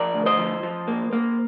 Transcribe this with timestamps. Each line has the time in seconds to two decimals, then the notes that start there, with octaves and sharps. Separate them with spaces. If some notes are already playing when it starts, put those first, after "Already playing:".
Already playing: F3 A#4 D5
0.14 D2
0.26 C5 D#5
0.39 F3
0.63 F3
0.88 A#3
1.13 A#3